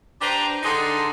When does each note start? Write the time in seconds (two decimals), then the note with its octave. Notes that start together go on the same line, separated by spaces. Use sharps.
0.21 D4 G4 B4 C5 G5 A#5
0.63 D3 D#4 G#4 D5 C6